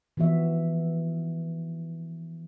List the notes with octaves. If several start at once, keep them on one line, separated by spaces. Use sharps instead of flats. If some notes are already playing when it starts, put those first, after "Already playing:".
E3 F3 B3 F#4 E5